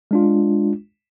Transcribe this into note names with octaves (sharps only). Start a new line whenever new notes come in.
G#3 D4 F4